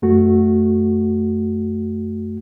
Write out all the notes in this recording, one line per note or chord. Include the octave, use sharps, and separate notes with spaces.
F#2 A3 F#4